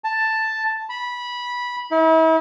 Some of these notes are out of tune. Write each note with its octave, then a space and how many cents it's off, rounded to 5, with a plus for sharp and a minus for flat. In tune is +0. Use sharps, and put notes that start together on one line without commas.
A5 +5
B5 -15
E4 -40